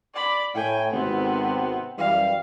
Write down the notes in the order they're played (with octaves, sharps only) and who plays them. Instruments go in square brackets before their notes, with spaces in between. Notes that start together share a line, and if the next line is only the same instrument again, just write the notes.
[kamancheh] D5 B5
[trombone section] A2 [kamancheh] G5 G#5
[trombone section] G#1 C3 [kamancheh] B3 C4
[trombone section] F#2 E3 G3 [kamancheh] F5